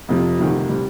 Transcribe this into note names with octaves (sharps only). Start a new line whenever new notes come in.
F2 C3 F3
D2 C3 D#3 G3
C3 G3